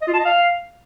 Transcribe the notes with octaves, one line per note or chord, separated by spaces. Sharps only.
D#5
F4
A5
D#5
F5